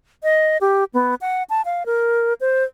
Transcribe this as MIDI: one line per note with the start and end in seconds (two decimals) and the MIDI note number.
0.23 0.58 75
0.61 0.84 67
0.94 1.15 59
1.21 1.43 78
1.50 1.62 81
1.65 1.83 77
1.86 2.34 70
2.41 2.64 72